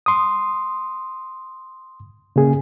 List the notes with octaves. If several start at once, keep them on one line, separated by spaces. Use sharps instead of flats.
C6 D#6
C#3 A#3 G#4